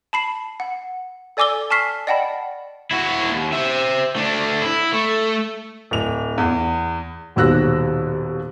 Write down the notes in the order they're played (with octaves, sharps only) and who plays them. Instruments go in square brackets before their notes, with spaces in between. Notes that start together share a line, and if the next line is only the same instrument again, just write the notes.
[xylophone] A5 B5 C7
F#5
A4 D5 G#5 D6 E6 G7
G#5 A5 C#6 F6 B6 C7
D5 D#5 F#5 G5 A5 B5
[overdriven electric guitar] E4 F#4
D#2
C5 E5
A3 D4
E4
A3
[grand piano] D1 F7
E2
[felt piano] D#1 D#2 B2 E6 F#6 A#6